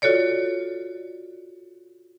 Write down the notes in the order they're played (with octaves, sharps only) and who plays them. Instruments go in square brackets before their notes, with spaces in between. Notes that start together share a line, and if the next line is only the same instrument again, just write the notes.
[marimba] F4 F#4 A4 C#5 D5